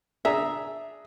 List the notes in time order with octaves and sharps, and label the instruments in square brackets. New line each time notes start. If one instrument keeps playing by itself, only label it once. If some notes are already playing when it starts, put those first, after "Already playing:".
[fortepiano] D4 G#4 A#5 [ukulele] E5